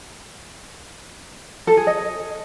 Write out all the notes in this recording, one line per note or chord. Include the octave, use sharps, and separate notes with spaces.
A4
G#4
D#5